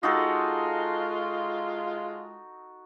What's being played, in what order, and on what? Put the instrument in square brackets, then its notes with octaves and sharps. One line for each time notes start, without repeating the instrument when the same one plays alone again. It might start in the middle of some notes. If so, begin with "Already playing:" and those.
[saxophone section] G#3 F4 [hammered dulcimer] D#4 F#4 A4